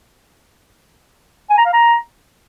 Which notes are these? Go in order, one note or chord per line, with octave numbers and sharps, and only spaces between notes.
G#5
A#5
F5
A#5